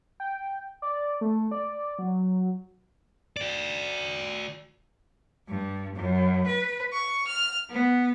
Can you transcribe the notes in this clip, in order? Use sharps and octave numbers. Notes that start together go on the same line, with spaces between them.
G5
D5
A3
D5
F#3
F#4 D5
G2
F#2
B4
C#6
F6
B3